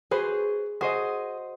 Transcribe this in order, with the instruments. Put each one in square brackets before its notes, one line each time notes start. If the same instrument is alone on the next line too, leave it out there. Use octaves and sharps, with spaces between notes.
[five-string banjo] F#4 B4 C5 [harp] G#4
[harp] F#4 C5 D#5 [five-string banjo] G#4